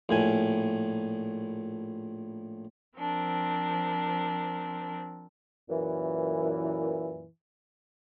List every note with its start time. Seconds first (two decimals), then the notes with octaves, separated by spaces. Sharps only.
0.09 A#1 A2 G#5
2.98 F3 C4 D4 A#4
5.69 F#2 A#2 E3